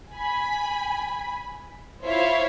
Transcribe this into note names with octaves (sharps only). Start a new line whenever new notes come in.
G#5 B5
E4 F4 C5 C#5 E5 F5